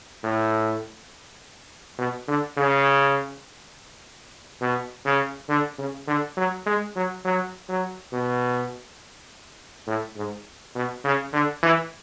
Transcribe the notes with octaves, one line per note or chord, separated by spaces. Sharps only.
A2
B2
D3
C#3
B2
C#3
D3
C#3
D3
F#3
G#3
F#3
F#3
F#3
B2
A2
G#2
B2
C#3
D3
E3